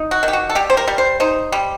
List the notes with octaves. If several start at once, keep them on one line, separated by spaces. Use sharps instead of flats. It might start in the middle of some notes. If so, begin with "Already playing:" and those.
Already playing: D#4
F#4
D#3
G4
F#4
A4
G3 G4
C5
A#4
G3
C5
D#4 C5
G3